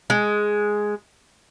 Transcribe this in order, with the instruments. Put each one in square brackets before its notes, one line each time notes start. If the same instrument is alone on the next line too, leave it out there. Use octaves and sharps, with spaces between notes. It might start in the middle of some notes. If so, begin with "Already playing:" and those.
[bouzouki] G#3